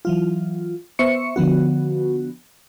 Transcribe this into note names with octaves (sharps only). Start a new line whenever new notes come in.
E3 F#3 F4
B3 C5 E5 C#6 C#7
D3 F3 B3 F#4